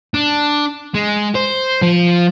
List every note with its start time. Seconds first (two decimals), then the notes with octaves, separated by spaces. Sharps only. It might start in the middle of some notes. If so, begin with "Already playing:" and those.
0.14 D4
0.94 G#3
1.35 C5
1.82 F3